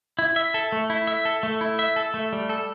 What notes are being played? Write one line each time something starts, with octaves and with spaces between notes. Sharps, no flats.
E4
E5
A4
A3
E4
E5
A4
A3
E4
E5
A4
A3
G3
A4